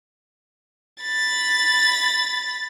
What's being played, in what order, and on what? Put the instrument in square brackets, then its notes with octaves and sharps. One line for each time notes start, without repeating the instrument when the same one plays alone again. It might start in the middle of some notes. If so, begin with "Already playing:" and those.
[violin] B5 A6